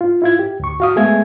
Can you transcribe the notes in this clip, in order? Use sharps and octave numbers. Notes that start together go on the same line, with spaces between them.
F4
E4 F4 G#6
G4
D2 C#6
F#4 F5 D#6
G#3 A3 B3 G#4 E5 G#6